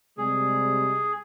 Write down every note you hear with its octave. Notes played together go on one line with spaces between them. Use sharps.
C3 G3 G#3 G#4